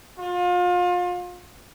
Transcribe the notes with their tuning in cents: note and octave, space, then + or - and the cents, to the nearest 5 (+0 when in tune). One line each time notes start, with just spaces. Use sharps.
F4 +35